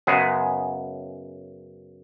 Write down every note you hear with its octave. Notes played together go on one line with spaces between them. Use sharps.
F#2 C#3 G#3 B3 G#4